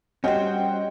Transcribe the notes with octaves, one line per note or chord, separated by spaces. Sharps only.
G3 C#4 F#4 C5 D#5 F#5 G5